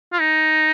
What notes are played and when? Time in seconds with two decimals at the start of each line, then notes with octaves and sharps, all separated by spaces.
0.13 F4
0.20 D#4